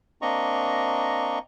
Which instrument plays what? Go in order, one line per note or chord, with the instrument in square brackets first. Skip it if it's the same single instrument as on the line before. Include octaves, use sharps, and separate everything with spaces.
[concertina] A#3 C4 D4 D#5 A#5 C#6